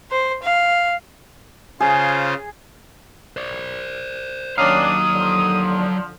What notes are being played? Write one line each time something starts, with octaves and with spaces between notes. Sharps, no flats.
C5
F5
C#3 F4 G#4 C5
C5 D5
D#2 D#3 F#3 C#4 D4 F5 A#5 D#6
D3 F3